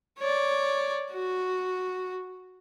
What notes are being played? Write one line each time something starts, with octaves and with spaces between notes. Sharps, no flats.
C#5 D5
F#4